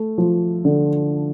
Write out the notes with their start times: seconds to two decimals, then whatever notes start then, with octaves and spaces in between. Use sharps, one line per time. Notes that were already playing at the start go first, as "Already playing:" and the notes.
Already playing: A3
0.18 F3
0.65 D3